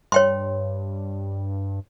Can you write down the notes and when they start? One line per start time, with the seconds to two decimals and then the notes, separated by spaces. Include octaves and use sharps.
0.12 G2 C#5 G5 C6